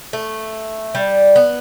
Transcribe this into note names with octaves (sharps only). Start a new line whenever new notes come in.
A3
G3
B3